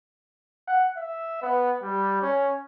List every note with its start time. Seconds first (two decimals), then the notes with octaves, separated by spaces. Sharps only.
0.68 F#5
0.96 E5
1.42 B3
1.82 G3
2.22 C#4